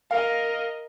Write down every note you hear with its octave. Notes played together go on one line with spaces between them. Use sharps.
A#4 D#5 F5